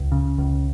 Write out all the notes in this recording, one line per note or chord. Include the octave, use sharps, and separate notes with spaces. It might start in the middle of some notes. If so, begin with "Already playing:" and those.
Already playing: C#2
C#3
C#2